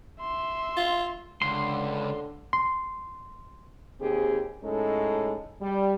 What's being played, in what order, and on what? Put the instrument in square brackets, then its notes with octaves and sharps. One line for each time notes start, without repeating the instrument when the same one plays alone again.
[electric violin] E5 C6
[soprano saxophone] F4
[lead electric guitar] C#2 [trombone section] D3 [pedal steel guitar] C6
[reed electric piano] C6
[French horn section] D#2 C4 G4 G#4
A2 G#3 C#4 D#4 A4
G3